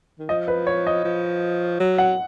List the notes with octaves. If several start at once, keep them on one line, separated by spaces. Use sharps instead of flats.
D#3
F3 D#5
B4
C#5
D#5
F3
F#3
F#5